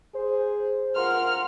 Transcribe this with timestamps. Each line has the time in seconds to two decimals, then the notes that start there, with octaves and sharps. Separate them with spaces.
0.15 G#4 C5
0.96 F4 A#4 F#5 C6 F6